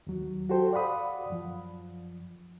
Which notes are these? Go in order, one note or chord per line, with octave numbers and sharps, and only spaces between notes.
D#2 F#3
F#4 G4 A4 C5 G5
D5 F5 F#5 B5 D#6
F#2 F3